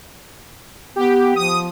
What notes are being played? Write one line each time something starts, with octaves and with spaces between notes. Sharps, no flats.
B3 G4
F3 D#6